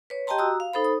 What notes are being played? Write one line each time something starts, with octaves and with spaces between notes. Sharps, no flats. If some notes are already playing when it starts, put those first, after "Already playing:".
B4 C#5
G4 D#5 G5 A5 A#5 C6
F#4 A#5 D#6 E6
F5
D#4 A4 C5 B5
D#6